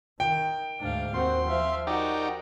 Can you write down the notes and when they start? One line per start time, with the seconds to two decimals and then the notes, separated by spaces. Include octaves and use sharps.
0.20 D#3 G5
0.80 D2 G#2 D4 F5
1.14 D#2 C4 F#4 C6
1.47 F3 E5 F5
1.87 D#4 F#4 G4 A#4 D5